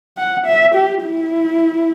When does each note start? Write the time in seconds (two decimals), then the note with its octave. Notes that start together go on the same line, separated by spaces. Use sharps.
0.18 F#5
0.46 E5
0.74 G4
1.04 E4